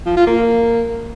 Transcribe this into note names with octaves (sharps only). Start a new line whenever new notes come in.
F3
F4
A#3